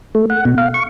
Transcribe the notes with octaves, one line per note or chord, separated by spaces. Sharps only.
A3
F#5
B2
F5
C#6